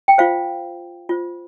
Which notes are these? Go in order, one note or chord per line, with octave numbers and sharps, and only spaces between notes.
G5
F4 C5 F5
F4 C5